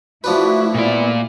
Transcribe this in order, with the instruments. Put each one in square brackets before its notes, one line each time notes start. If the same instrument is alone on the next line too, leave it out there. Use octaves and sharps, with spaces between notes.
[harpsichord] F3 D4 B4 [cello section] A3 E4 [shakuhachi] F#4
[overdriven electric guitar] A#2 D5 [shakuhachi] B3